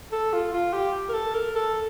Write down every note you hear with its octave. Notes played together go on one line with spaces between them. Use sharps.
A4
F4
F4
G4
A#4
A4
A#4
A4